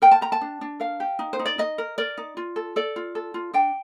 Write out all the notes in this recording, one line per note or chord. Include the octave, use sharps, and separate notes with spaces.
A#4 G5
A5
G4 A#5
A5
D4
D4
A#4 F5
G4
D#4
C5
D#4
D5
D#4 D#5
A#4
A#4 D5
D#4
F4
A4
A4 D5
F4
A4
F4
D4 G5